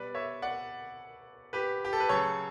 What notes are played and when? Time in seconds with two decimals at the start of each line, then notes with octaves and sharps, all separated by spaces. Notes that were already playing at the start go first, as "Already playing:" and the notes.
Already playing: B2 G3 B4 D5
0.15 C#5 E5
0.42 D5 F#5
1.53 G4 B4
1.85 G4
1.93 A4
2.00 B4
2.09 C#3 F#3 A3 A4 C#5